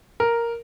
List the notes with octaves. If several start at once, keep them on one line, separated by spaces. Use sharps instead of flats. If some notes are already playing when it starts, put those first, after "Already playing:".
A#4